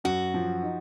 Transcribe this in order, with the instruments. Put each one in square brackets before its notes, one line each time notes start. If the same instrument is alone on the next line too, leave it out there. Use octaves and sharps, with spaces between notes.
[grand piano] F#2 [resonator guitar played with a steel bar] F#4
[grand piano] F3
D#4